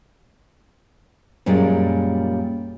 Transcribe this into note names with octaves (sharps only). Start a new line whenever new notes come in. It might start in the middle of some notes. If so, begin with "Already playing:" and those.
F#2 A#2 G3 G#3